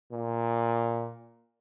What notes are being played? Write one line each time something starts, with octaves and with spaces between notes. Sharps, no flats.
A#2